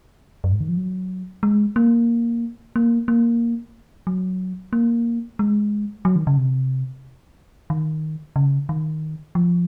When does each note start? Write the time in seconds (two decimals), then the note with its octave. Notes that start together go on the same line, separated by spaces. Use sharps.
0.44 F#2
0.52 G#2
0.60 D#3
0.69 F3
0.77 F#3
1.43 G#3
1.76 A#3
2.76 A#3
3.08 A#3
4.07 F#3
4.73 A#3
5.39 G#3
6.05 F#3
6.16 D#3
6.27 C#3
6.37 C3
7.70 D#3
8.36 C#3
8.69 D#3
9.35 F3